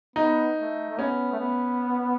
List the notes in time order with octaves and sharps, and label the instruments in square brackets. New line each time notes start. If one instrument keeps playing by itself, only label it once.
[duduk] B3 [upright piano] D#4
[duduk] A3
A3
[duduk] B3 [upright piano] C#4
[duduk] A3
B3